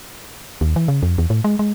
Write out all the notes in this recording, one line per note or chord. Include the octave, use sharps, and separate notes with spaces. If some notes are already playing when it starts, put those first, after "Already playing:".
D#2
E3
C#3
F2
E2
A2
G#3
G#3